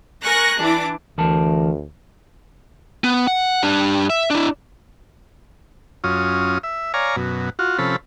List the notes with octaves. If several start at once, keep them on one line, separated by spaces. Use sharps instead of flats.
A#4 G#5 C#6 F#6 A#6
E3 D4 E4 D6
D2 E3 A#4 A5
B3
F#5
G3 D4
E5
D4 E4
F#2 C#4 F4 D#6
E5
C#5 D5 F5 G#5 A#5
F#2 B2
F4 F#4
C3 F3 C#4 A4 B5